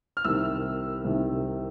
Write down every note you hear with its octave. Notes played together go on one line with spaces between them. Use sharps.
F6
C2 C3 D#3 E6
C2 C3 D#3